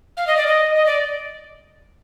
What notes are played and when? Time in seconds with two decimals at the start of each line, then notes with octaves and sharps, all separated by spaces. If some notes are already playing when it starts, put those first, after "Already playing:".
0.17 F5
0.27 D#5
0.37 D5
0.47 D#5
0.75 D#5
0.86 D5